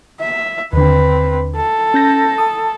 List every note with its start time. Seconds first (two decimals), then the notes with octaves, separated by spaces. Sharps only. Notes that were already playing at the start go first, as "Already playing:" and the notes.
0.20 E5
0.73 D#2 D3 C4 B4
1.56 A4
1.94 C#4 G6 A#6
2.38 A5 D#6